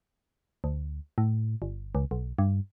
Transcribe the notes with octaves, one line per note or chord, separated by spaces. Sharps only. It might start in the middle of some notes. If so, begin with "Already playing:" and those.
D2
A2
G1
C#2
B1
G2